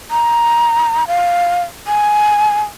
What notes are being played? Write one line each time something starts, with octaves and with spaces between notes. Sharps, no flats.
A#5
F5
G#5